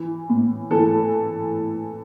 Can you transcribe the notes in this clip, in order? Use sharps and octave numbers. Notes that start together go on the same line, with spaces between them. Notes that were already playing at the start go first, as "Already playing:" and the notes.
Already playing: E3
A2
E3 A4